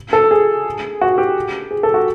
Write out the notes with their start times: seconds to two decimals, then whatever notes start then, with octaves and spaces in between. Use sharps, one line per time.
0.13 A4
0.31 G#4
1.01 F#4
1.18 G4
1.71 G#4
1.83 A4
1.94 F#4